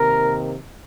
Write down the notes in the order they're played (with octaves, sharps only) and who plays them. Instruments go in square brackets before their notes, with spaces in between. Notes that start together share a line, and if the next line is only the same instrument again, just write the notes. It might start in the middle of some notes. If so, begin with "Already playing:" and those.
Already playing: [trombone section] C3 D#3 A#3 A#4